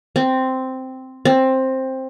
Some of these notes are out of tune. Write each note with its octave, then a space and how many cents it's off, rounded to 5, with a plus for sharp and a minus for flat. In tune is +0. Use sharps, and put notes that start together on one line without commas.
C4 -5
C4 +10